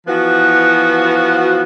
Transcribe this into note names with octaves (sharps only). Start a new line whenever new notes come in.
E3 F3 B3 F#4